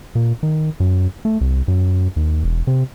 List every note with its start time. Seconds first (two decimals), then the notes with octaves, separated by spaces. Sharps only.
0.15 A#2
0.43 D#3
0.80 F#2
1.25 A3
1.41 C2
1.68 F#2
2.16 D#2
2.44 E1
2.67 C3